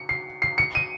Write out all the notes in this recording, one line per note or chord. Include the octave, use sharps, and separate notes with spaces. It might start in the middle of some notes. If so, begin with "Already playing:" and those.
Already playing: C#7
C7
C7
C#7
D#7